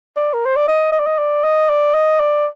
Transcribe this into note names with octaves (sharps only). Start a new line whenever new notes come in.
D5
A#4
C5
D5
D#5
D#5
D5
D#5
D5
D#5
D5
D#5
D5